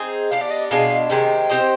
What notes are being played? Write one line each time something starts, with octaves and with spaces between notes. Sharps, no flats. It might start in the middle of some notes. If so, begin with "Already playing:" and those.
Already playing: C4 D#4 G#4
B3 D4 G4 F5
D5
D#5
B2 G#3 D4 F5
C3 D#3 G#3 G5
C4 G4 C5 D#5